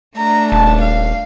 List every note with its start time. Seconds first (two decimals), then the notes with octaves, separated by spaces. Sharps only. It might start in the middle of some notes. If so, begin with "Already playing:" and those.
0.17 A3 D4 A#5
0.52 D#1 A5
0.81 F5